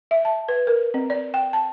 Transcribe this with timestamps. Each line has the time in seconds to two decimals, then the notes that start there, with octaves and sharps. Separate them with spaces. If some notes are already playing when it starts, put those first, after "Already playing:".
0.11 E5
0.25 A5
0.48 B4
0.67 A#4
0.94 C4
1.10 D5
1.34 G5
1.53 A5